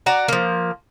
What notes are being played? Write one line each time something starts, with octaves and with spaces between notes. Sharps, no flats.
F#4 D5 A#5
F3 A#3